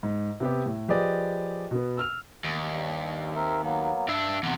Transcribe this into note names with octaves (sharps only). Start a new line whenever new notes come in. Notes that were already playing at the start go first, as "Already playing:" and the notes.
G#2
C3 B3 G4
A2
F3 G4 G#4 B4 D5 D#5
B2 B3
E6 F6 F7
D#2
G2
C4 A#4 E5
F#3 A#3 B3
G2 D4 E5 E6
E2 C3 F#5